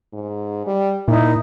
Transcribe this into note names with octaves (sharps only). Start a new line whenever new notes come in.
G#2
G3
A#2 D#4 E4